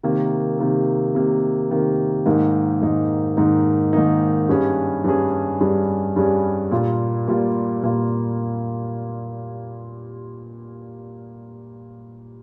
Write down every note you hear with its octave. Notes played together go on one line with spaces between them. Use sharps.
C3 D#3 A#3
C3 D#3 A#3
C3 D#3 A#3
C3 D#3 A#3
G#2 D#3 A#3 D#4
G#2 D#3 A#3 D#4
G#2 D#3 A#3 D#4
G#2 D#3 A#3 D#4
G2 G3 C#4 G#4
G2 G3 C#4 G#4
G2 G3 C#4 G#4
G2 G3 C#4 G#4
A#2 G3 A#3 F4
A#2 G3 A#3 F4
A#2 G3 A#3 F4